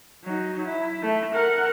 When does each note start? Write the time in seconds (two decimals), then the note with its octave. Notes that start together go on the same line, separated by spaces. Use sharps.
0.24 F#3 D#4
0.65 E4
1.03 A3
1.33 A#4 F#5